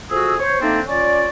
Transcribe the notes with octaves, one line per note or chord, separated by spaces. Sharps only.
F2 F#4 G#4 E6
C5 C#5
A3 A#3 C4 D4 D#4
C#4 F4 C#5 D5